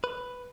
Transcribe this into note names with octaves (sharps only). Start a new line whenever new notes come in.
B4